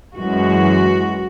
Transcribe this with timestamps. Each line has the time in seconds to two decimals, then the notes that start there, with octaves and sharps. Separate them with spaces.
0.17 F#2 E3 G#3 F#4